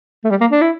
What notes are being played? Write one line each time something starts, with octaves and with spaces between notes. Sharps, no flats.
A3
G3
A#3
D4
E4